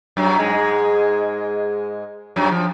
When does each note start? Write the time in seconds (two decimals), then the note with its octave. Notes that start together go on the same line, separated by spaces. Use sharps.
0.17 F#2 F#3
0.39 G#2 G#3
2.36 F#2 F#3
2.51 F3